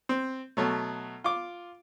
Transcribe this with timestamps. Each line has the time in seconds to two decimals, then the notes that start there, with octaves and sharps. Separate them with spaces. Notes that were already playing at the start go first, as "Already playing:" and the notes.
0.09 C4
0.57 B2 F#3 A3
1.24 F4 D6